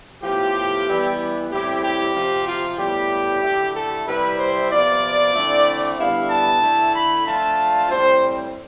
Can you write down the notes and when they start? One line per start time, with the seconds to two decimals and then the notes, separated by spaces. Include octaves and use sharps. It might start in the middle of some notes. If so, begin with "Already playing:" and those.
0.22 A2 F3 B3 F4 G4
0.86 E3 G3 B3 E4
1.50 A2 G3 C4 E4 G4
1.82 G4
2.15 C3 F3 C4
2.47 F4
2.78 A2 G3 B3 G4
3.43 D3 A3 E4
3.74 A4
4.06 C3 G3 C4 E4 B4
4.38 C5
4.70 C3 F3 B3 D5
5.34 D3 A3 C4 E4
5.98 D3 G3 B3 E4 F5
6.30 A5
6.61 D3 A3 E4
6.93 B5
7.26 F3 A3 D4 F4 A5
7.89 A2 G3 C4 C5